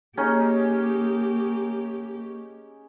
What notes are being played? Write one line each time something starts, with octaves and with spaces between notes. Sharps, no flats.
A#3 C#4 D#4 G4 G#4